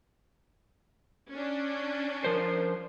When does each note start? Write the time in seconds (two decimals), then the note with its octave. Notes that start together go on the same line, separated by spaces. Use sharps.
1.30 C#4 D4
2.25 F3 A#4 C5